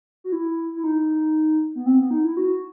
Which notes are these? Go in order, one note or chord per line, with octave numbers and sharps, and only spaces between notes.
F#4
E4
E4
D#4
B3
C4
B3
D#4
E4
F#4